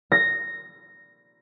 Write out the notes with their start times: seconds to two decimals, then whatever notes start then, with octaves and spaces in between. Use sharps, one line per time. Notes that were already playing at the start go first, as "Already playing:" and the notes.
0.12 A#6